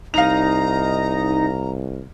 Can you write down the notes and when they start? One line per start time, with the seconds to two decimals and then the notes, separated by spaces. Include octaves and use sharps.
0.14 C2 D#4 F5 A#5 A#6 F7